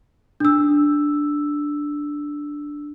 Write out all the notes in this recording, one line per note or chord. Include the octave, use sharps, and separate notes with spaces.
D4 E6